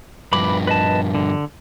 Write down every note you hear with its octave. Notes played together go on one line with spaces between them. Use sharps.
G2 F3 B4 B5 D6
B4 D#5 A5
D3